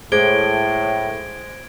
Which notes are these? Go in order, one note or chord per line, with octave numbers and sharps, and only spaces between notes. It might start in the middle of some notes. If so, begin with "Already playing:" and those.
A2 G#3 C5 D6 G#6 D7 G7